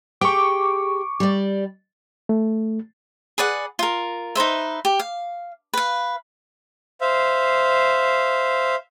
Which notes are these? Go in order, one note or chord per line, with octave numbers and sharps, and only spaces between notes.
G4 G#4 G5 C#6 D6
G3 D5
A3
G#4 B4 D5 F#5
F4 A#4
D#4 B4 C5 E5
G4
F5
B4 F5
C5 E5 F5